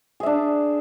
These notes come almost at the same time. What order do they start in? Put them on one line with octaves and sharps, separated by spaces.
G#4 E5 D4